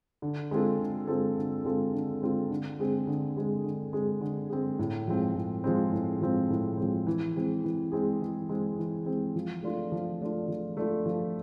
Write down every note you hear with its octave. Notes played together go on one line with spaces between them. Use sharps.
D3
G#3 C4 F4 A4
D3
G#3 C4 F4 A4
D3
G#3 C4 F4 A4
D3
G#3 C4 F4 A4
D3
G#3 C4 G#4
D3
G#3 C4 G#4
D3
G#3 C4 G#4
D3
G#3 C4 G#4
A2
F3 G#3 C4
A2
F3 G#3 C4
A2
F3 G#3 C4
A2
F3 G#3 C4
E3
G#3 C4 G#4
E3
G#3 C4 G#4
E3
G#3 C4 G#4
E3
G#3 C4 G#4
F3
A3 D4 F4
F3
A3 D4 F4
F3
A3 D4 F4
F3